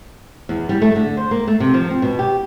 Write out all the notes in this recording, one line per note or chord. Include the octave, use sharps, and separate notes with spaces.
E2
G3
A3
D3
C5
A#3
A3
C3
F3
C4
B2
G4